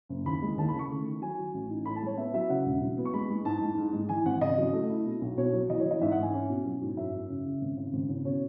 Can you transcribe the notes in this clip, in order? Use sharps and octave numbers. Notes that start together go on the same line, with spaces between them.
F#1
D#2 B5
G#3
D#2 A5
B5
C#3 C#6
A3
D#3
F#3 G#5
F#3
A1
D#4
A2 B5
A5
G#3 C#5
B3 E5
F#3 E5
C#3 F#5
E1
F#3
B3
C#6
G#3 B5
G#3
G#2 A5
G#2
G#2
G#3
E3 G#5
G#1 F#5
C#3 D#5
F#3
A3
E4
B2
B1
B2 C#5
F#3
E3 D#5
C#5
E3
D#5
G#2 E5
F#5
G#2
G#5
C#4
B2
F#3
G#2
F#2 E5
F#2
C#3
C#3
G#1
C#3
G#1
C#3
B2 C#5